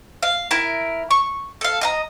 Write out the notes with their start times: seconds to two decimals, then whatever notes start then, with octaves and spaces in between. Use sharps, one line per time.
0.23 F5
0.51 E4 A#4
1.11 C#6
1.61 A4 F5
1.81 D#5 F5 A#5